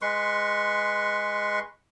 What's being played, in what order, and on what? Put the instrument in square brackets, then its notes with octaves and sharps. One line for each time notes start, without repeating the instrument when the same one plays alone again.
[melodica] G#3 B4 C6 C#6